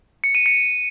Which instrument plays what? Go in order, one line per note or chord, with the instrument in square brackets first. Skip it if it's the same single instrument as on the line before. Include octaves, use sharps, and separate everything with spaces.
[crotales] C#7
D#7
C#7